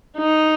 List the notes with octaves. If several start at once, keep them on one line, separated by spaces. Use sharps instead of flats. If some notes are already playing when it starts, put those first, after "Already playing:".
D#4